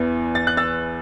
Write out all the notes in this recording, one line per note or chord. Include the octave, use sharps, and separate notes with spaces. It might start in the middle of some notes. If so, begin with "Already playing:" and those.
Already playing: E2 E3 B3
A6
F#6
E6 A6